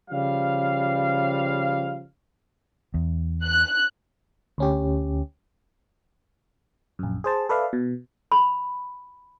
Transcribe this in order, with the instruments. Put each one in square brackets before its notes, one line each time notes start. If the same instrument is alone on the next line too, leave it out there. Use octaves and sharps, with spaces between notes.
[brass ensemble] C#3 F3 G3 F5
[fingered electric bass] E2
[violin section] F#6
[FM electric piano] D2 C#4 G4
A#1 F#2
G#4 C5 A5
A4 B4 D5 E5 F5
B2
[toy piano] B5